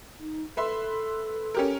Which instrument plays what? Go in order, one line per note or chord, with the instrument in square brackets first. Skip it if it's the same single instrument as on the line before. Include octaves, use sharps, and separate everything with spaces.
[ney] D#4
[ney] A4 [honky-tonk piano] B4 E5 C6
[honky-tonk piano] C#4 G4 A#4